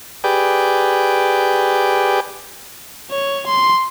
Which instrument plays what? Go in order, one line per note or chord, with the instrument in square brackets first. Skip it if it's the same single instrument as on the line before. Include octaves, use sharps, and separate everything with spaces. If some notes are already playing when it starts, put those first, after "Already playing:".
[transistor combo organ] G4 G#4 B4 D5 G5
[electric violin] C#5
C6